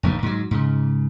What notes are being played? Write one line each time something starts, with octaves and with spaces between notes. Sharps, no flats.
F1 A#1 G#2 D#3
G#2 F#3
G#2 C#3